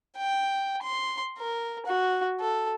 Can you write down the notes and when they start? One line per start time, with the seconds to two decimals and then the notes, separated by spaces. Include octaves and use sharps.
0.17 G5
0.82 C6
1.38 A#4
1.86 F#4
2.41 A4